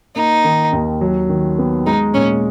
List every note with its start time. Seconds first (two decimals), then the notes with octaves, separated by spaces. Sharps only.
0.16 A#3 D#4
0.44 D#3
0.73 D#2
1.01 F#3
1.29 D#3
1.58 B3
1.86 G#3 D#4
2.14 A#2 C#4